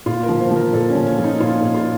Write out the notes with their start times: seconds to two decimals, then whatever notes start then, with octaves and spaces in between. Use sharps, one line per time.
0.06 A#2 F4
0.23 A#4
0.29 F3
0.40 C5
0.51 F3
0.56 A#4
0.73 A#2 A4
0.89 C#4
0.95 F3
1.07 C#4
1.19 F3
1.24 D#4
1.40 A#2 F4
1.62 A#2
1.74 F4